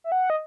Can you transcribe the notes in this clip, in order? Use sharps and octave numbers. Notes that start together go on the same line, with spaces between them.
E5
F#5
D#5